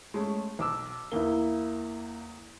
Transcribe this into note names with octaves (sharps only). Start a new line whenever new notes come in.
G#3 A3 C#4
B1 D6 E6
E2 A#3 E4 G7